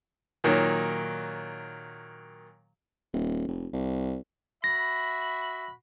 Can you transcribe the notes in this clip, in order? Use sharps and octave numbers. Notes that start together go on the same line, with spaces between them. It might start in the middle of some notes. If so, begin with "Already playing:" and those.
A#2 D#3 F#3
D#1
F1
C2
F#4 E5 B5 A#6